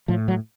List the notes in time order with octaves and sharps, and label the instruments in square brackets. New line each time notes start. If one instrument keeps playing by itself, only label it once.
[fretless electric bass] A2 F3
F#3